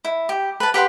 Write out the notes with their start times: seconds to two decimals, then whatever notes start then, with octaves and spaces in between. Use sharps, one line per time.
0.04 E4
0.29 G4
0.60 B4 A5
0.74 G4 B4 F#5 C6